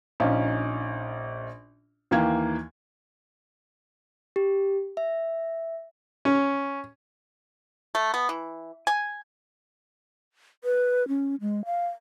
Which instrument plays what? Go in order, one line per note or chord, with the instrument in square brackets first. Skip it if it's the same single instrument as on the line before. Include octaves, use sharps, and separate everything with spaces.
[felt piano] A#1 C#4 D#4 F5
D#2 E3 A#3 F5 G5 G#6
[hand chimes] G4
E5
[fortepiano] C#4
[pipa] A3
B3
E3
G#5
[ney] B4
C#4
G#3
F5